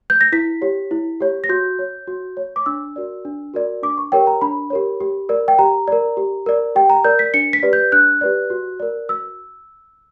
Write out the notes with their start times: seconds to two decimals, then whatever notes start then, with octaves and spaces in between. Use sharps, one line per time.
0.10 G6
0.21 A#6
0.32 E4 B6
0.62 G4 C#5
0.91 E4
1.20 G4 C#5
1.44 A#6
1.49 F#4 G6
1.79 C#5
2.07 F#4
2.37 C#5
2.56 D6
2.66 D4 E6
2.96 F#4 A#4 D5
3.25 D4
3.54 F#4 A#4 D5
3.83 D4 D6
3.98 C#6
4.12 G4 A#4 C#5 G5
4.27 A#5
4.41 D4 B5
4.70 G4 A#4 C#5
5.00 G4
5.29 A#4 D5
5.48 G5
5.59 G4 A#5
5.88 A#4 D5
6.17 G4
6.46 A#4 D5
6.75 G4 G5
6.90 A#5
7.04 A#4 D5 G6
7.19 B6
7.34 D4 C#7
7.53 B6
7.63 G4 B4 D5
7.73 G6
7.92 D4 F#6
8.21 G4 B4 D5
8.50 F#4
8.80 A#4 D5
9.09 F#4 E6